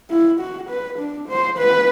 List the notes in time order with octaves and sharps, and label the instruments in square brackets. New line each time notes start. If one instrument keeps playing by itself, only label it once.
[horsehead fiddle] E4
F#4
B4
D4
C5
B4